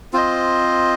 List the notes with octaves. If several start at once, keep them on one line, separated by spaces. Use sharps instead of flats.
C4 F4 C5 D#5